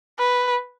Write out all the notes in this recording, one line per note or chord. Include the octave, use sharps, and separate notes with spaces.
B4